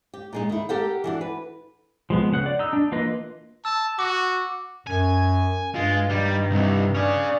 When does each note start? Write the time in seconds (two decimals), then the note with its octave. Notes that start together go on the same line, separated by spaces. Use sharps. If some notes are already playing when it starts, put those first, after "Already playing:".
0.14 G4
0.33 A#2 G#3 D#4
0.49 D#3 E4
0.69 G4 A4 A#4 F#5 G5
1.04 E3 D4 F#4
1.21 B4
2.10 F3 G#3 B3
2.32 C#3 F#5 F#6
2.46 D5
2.59 D#4 E6
2.73 D4
2.92 E3 A#3 F4 B4 D#5
3.65 A5 E6
3.99 F#4 D6
4.87 F#2 G#5
5.75 G2 G#3 F4
6.10 D#3 G3
6.51 C2 C3
6.95 C#4 D4 G#4